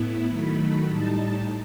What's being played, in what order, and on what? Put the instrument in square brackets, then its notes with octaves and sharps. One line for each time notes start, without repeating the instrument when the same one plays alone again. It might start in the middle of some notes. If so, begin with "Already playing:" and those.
Already playing: [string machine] A2 B3 E4
D#3 F#3 A3 B5
A2 G3 D#4 A5